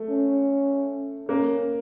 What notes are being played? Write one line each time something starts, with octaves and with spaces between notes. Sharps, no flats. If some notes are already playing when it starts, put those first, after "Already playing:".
Already playing: A3
C#4
A#3 C#4